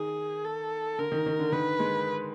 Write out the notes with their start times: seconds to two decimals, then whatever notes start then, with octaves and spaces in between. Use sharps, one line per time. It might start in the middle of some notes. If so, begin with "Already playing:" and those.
Already playing: D#3 G#4
0.45 A4
0.98 D3 A#4
1.12 D#3
1.26 D#3
1.39 D3
1.52 D#3 B4
1.80 G#3